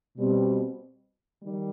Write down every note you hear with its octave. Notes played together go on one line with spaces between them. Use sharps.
B2 G3 C4
D#3 G3